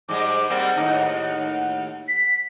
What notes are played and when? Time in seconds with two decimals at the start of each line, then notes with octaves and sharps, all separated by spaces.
0.09 G#2 G3 G#3 D6
0.50 G3 A#3 C4 F#5
0.76 D#2 A2 D#4
2.08 B6